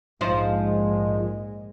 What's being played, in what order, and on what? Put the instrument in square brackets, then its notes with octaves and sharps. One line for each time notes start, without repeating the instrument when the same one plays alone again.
[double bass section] A#1 G#2 G#3 [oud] F3 D#4 C5